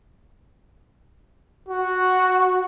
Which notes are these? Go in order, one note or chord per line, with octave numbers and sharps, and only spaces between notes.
F#4